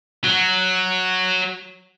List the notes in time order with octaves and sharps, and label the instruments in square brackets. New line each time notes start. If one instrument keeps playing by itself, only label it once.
[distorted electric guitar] F#3